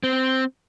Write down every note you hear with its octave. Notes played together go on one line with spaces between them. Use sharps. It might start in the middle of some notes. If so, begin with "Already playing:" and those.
C4